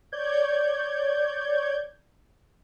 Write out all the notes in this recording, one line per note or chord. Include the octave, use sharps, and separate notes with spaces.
C#5 D5 G6 G#6